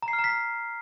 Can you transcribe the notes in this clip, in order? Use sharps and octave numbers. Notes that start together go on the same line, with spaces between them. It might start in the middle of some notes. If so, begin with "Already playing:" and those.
A#5
C7
F6
A#5
B6